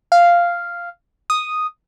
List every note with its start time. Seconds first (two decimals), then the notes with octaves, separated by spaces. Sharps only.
0.12 F5
1.30 D#6